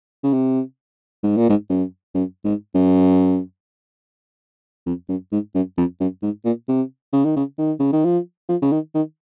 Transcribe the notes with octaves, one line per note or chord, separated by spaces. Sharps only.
C#3
C3
G#2
A#2
G#2
F#2
F#2
G#2
F#2
F2
F#2
G#2
F#2
F2
F#2
G#2
A#2
C3
C#3
D#3
C#3
D#3
C#3
D#3
F3
F3
C#3
D#3
D#3